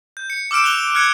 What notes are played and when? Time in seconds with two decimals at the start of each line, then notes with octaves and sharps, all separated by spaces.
0.17 G6
0.30 C#7
0.51 D6 E6 F6 D7 E7
0.64 F#6 E7 F7 G7
0.95 F6 F#6 G#6 C#7